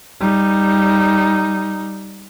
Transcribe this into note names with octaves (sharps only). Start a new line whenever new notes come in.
G3 D#4